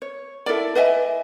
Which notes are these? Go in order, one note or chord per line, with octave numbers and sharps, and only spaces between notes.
C#5
E4 A4 A#4 D5
B4 D#5 E5 G#5